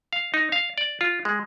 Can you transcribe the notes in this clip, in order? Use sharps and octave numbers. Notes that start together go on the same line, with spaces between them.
F5
D#4
F5
D5
F4
G#3